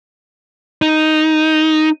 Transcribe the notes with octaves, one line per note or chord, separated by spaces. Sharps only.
D#4